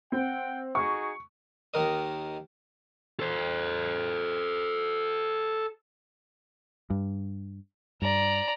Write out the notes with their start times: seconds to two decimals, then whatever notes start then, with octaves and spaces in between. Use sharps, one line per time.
0.12 C4 F#5 G5
0.75 D#4 F#4 G#4 C#6
1.74 D#2 D#3 A#4 D#5
3.20 A4 C5
6.90 G2
8.02 G2 D5 A#5